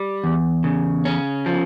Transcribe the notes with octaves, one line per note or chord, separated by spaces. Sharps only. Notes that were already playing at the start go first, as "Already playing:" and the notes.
Already playing: G3
E2
C#3
C#4
F3